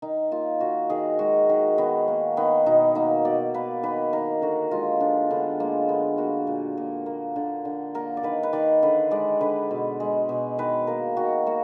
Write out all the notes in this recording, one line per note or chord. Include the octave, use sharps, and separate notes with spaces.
D#3 D#4
A#3 F4
D#3 F#4
D#3 G#4
G#3 F#4
D#3
D#3 B3
A#3
D#3 B3
B2 D#4
A#3 D#4
B2 D5
A#3 B4
D#3 B4
D#3 A#4
D3 F#4
G#3 F4
D3 D4
D3 B3
G#3 A#3
D3 B3
A#3 F#4
A#2
A#2
A#3
D3
D3
A#3 A#4
D5
D#3 B4
B4
D#3 D5
D3 B4
G#3 D5
D3 B4
B2
G#3
B2
D#3 B4
A#3 A#4
D#3 F#4
A#3 F#4